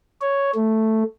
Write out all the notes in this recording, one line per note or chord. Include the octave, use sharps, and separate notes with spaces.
C#5
A3